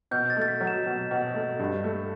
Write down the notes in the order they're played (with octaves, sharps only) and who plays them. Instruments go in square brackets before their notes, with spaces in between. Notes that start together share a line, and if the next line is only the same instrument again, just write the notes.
[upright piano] B2 [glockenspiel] G6
[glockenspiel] A6
[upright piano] A3
[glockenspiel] A6
B6
[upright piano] F#3
[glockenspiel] E7
[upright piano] B2
B2
A3
G2
A3